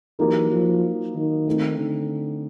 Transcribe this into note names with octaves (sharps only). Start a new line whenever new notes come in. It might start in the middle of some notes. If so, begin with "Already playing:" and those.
E3 F#3 A#3 D#4 G4 A#4
F3
D#3
A3 C4 D#4
D3